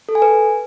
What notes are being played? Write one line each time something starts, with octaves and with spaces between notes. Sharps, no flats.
A4
G#5
B4